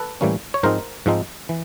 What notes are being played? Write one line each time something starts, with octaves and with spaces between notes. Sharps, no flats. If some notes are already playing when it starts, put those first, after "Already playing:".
Already playing: A4 B4
A2 E3 G3 A#3 C#4
C#5
G#2 F3 G#3 C4 D#4 A#4 C5
G#2 F3 G#3 C4 D#4
E3